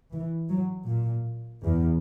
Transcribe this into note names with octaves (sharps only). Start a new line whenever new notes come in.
E3
F#3
A#2
E2